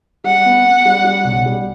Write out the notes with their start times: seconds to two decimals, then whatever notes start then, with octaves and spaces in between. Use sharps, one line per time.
0.24 G3 F#5
0.45 B3
0.65 B3
0.85 G3
1.05 G3
1.25 B1
1.46 G3